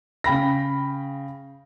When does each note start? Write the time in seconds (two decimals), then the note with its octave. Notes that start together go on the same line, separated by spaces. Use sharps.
0.24 C#3 G5 B5 A#6